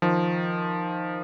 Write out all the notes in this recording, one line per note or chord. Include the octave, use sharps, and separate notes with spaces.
D#3 F3